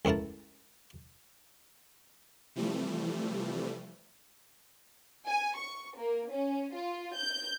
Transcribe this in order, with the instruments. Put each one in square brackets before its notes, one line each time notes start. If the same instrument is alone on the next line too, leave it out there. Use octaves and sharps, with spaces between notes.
[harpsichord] C#2 A2 E4 A#4 A5
[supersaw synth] C3 E3 F3 G3 A3
[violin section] G#5
C#6
A#3
C#4
F4
G6